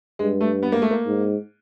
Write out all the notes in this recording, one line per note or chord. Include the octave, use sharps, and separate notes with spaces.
G2 G#3
A3
B3
A#3
A3
A#3
G#2